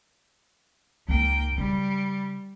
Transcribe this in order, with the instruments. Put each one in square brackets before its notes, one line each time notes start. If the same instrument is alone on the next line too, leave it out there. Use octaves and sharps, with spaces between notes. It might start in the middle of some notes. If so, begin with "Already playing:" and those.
[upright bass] C#2 D#4 [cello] A#3 G5
[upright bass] C#3 [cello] G3